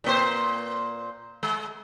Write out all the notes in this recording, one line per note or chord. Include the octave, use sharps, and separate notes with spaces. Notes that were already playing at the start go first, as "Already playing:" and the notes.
A#2 A#3 C5
G#3